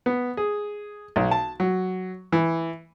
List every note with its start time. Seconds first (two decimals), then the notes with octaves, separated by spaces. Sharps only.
0.06 B3
0.37 G#4
1.16 B1
1.31 A5
1.60 F#3
2.32 E3